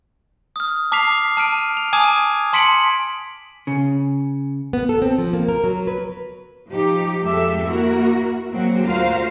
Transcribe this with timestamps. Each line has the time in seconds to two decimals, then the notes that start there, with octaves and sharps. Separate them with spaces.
0.56 D#6 F6
0.92 A5 D6 F6 B6 C7 F7
1.37 A5 F6 D7 D#7
1.77 F7
1.93 G#5 A5 D6 D#6 G#6 D#7
2.53 A5 C6 B6 C#7 D7 F#7
3.67 C#3
4.73 B3
4.89 A4
5.02 C4
5.18 F3
5.33 A#3
5.49 A#4
5.64 F#3
5.87 B4
6.69 F3 D#4 G4
7.21 F2 G#3 G4 A4 E5
7.66 A#3 E4 F#4 A#4
8.52 F#3 G#3 A#3 C4 F#4
8.85 D2 F4 F#4 A#4 C5 F5